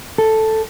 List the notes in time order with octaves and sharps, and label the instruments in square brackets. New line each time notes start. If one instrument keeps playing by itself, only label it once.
[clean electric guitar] A4